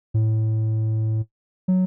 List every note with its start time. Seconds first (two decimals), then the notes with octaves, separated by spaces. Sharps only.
0.14 A2
1.68 F#3